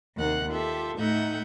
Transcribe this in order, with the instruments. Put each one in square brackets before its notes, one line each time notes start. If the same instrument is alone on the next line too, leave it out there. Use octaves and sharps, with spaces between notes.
[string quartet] D#2 C3 A#3 F#5 F#6
F4 G4 A4 E5
A2 A3 D#4 E5 F#5 G6